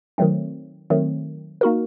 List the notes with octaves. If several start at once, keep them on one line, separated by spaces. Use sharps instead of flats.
D#3 F#3 A3 C4
D#3 F#3 A3 C4
A#3 D#4 F#4 A#4